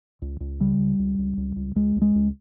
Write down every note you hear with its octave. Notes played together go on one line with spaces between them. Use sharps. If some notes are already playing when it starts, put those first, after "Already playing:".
C#2
C#2
C#3 G3
C#2
C#2
C#2
C#2
C#2
C#2 G#3
C#2
G#3
C#2